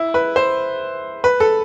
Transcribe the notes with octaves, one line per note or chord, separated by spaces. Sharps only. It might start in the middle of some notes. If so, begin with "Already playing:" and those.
Already playing: E4
B4
C5
B4
A4